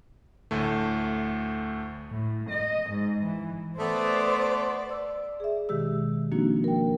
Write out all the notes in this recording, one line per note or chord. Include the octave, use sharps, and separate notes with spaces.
D2 A2 A3
A2
D#5
G#2
E3
A3 B3 C5 D5
D5 E6
G#4 E5
B2 D#3 G#3 G4 E6
F3 A#3 C4 D4 D#4 F#4
A#4 G5